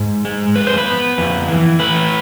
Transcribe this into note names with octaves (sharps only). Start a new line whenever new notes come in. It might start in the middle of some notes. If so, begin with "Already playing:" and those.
Already playing: G#2
G#3
F2 B4
C5
B4
B3
F2
E3
A3 B4